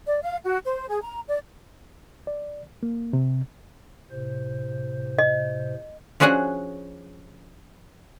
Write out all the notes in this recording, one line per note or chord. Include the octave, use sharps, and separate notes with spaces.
D5
F5
F#4
C5
G#4
A#5
D5
D5
A#3
C3
A2 C3 C5
D#5
F3 C#4 D4 F#4 G#4 F#5